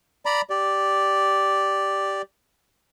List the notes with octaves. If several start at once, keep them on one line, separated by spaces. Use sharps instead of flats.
D5 A#5 B5
G4 D5